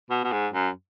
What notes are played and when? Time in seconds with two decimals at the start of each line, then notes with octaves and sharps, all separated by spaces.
0.10 B2
0.24 B2
0.32 G#2
0.53 F#2